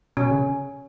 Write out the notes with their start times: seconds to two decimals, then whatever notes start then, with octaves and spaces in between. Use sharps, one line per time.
0.17 B2 C#4
0.31 C#3